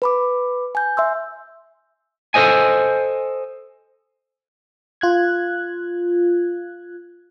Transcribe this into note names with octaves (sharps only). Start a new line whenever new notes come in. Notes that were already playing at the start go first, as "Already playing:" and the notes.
B4 B5 D6
G#5 G6
E5 C6 E6
A4 B4 C5 D#5 G#5
F4 F#6 G#6